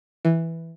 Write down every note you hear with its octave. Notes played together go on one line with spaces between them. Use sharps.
E3